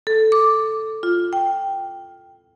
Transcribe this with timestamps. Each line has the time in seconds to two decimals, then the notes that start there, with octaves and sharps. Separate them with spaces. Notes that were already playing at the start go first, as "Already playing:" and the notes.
0.07 A4
0.32 D6
1.03 F4
1.33 G5